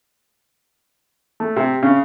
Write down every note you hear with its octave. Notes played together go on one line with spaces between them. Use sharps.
A3
C3
C#3